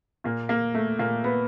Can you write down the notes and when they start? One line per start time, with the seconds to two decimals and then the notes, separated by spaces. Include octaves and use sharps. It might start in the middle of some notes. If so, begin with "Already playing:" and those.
0.24 A#2 A#3
0.49 A#3
0.74 A3
0.99 A#2 A#3
1.24 B3